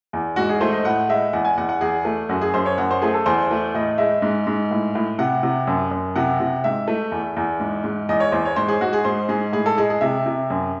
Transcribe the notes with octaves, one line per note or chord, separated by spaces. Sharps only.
E2
G#2 F#4
G#4
A3 C5
D#5
A2 F#5
G#3 E5
E2 F#5
G#5
E2 F#5
F#5
E2 G#4
A3
F#2 F#4
G#4
F#2 C5
C#5
F#2 F#5
C5
A3 G#4
A4
E2 C5
A3
A2 D#5
G#3 E5
G#2
G#2
A2
A2
C3 F#5
C3
F#2
F#2
C3 F#5
C3
G#2 E5
A3
E2
E2
G#2
G#2
E2 D#5
C#5
E2 C5
C#5
G#2 C5
G#4
G#2 F#4
G#4
G#2 C5
G#2 G#4
A2 G#4
A4
G#3 G#4
G#4
C3 E5
C3
F#2